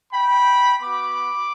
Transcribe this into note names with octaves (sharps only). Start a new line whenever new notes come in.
G5 B5
B3 F#4 B5 D6